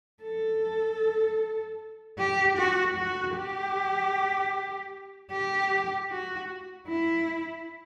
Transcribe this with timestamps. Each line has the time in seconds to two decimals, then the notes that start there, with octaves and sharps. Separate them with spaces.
0.24 A4
2.19 G4
2.58 F#4
2.97 F#4
3.36 G4
5.32 G4
6.11 F#4
6.88 E4